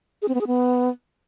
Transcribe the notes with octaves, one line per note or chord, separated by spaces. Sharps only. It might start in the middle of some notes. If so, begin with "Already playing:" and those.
G#4
C4
B3
G#4
B3